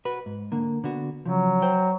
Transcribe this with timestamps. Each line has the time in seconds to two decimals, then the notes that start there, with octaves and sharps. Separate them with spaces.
0.05 F#4 B4
0.26 G#2
0.52 D3 A#3
0.84 D3 B3 F#4
1.26 C#3 F3 F#3
1.62 C5 G5